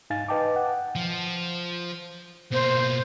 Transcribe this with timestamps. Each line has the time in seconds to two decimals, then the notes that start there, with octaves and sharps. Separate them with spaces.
0.10 G#2 D#4 F5 G#5 A6
0.28 B4 D#5 G5 A5 D6
0.56 F#5
0.96 F3
2.52 B2 A#3 C5